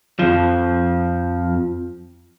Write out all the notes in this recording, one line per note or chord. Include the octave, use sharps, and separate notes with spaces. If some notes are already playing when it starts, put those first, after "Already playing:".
F2 F3